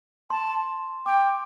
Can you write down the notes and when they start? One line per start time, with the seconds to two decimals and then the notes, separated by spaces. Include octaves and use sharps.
0.30 A5 C6
1.06 G5 D6